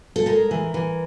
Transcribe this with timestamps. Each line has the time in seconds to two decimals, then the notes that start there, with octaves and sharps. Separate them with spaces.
0.16 A4
0.26 G#3 A#4
0.51 E3
0.74 E3